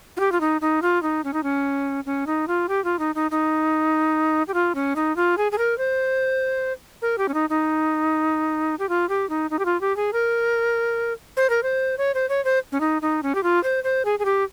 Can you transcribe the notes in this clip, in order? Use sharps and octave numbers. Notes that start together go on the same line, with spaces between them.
F4
G4
F4
D#4
D#4
F4
D#4
C#4
D#4
C#4
C#4
D#4
F4
G4
F4
D#4
D#4
D#4
G4
F4
C#4
D#4
F4
G#4
G#4
A#4
C5
A#4
G4
C#4
D#4
D#4
G4
F4
G4
D#4
D#4
G4
F4
G4
G#4
A#4
C5
A#4
C5
C#5
C5
C#5
C5
C#4
D#4
D#4
C#4
G4
F4
C5
C5
G#4
G#4
G4